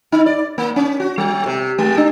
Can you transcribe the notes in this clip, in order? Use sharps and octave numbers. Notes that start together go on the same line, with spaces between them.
D#4
D5
A#3
C#4
F#4
G3
C3
G#3
D4